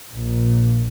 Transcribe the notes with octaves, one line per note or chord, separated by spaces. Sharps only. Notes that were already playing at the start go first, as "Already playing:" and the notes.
A#1 A#2